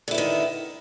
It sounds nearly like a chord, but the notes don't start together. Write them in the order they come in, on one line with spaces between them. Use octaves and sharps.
D3 E4 B3 D#3